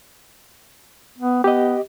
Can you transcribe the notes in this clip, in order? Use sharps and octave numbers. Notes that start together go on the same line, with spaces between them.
B3
B3 G4 D#5